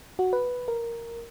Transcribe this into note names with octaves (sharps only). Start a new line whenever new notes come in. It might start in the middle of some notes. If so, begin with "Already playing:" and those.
F#4
B4
A#4